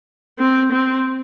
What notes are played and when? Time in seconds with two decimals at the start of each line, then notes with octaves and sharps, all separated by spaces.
0.39 C4
0.73 C4